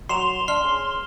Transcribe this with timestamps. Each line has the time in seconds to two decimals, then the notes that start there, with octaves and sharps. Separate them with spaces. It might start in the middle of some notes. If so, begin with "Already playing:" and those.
0.09 F#3 A#4 C6 C7 E7 F7
0.48 D4 F6 C7 G7
0.64 C#4 G#4